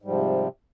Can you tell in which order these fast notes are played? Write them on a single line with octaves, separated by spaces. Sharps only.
G#2 G3 F3 C3